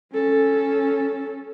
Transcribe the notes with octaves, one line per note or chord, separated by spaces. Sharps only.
C#4 A4